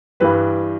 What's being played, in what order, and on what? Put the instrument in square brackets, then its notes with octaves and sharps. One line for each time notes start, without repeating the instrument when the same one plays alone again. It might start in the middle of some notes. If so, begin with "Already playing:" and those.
[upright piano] G2 E3 G3 B4